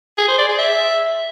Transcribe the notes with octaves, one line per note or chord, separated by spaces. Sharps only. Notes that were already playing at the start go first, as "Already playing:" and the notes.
G#4
C5
D5
G#4
E5